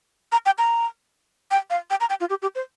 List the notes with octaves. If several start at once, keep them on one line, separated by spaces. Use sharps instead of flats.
A#5
G5
A#5
G5
F5
G5
A#5
G5
F4
G4
G4
C5